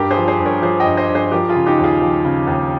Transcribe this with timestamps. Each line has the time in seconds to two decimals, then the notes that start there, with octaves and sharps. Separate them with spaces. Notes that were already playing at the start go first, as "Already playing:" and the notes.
Already playing: G2 G4 A#4
0.10 G#4 C5
0.17 F3
0.28 G#4 C5
0.39 G2
0.45 A#4 C#5
0.62 F3 G#4 C5
0.80 D#5 G5
0.86 G2
0.97 C5 D#5
1.09 G2
1.15 G#4 C5
1.32 F3 G4 A#4
1.49 F4 G#4
1.55 C#3
1.66 D#4 G4
1.78 D#2
1.84 F4 G#4
2.01 F3
2.25 C#3
2.47 D#2